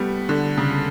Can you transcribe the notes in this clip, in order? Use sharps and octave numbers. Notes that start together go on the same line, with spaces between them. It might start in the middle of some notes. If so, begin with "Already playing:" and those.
Already playing: G3 A3 B3
D3
C#3